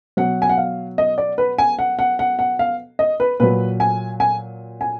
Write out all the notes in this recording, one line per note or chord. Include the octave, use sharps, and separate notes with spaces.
B2 F#3 F#5
G#5
F#5
F5
D#5
D5
B4
G#5
F#5
F#5
F#5
F#5
F5
D#5
B4
A#2 F#3 B4
G#5
G#5
G#5